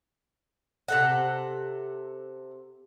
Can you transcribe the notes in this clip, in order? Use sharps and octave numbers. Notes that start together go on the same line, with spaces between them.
C3 A4 F#5